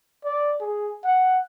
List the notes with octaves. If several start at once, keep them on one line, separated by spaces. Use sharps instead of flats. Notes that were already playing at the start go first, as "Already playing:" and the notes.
D5
G#4
F#5